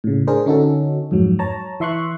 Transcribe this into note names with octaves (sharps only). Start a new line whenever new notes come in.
A2 C#3
D4 G#4 A#4 C5
D3 C#4 D#4 F#4 A4
F2 G#2 F#3
C#5 A5 A#5
E3 E5 C6 C#6 F#6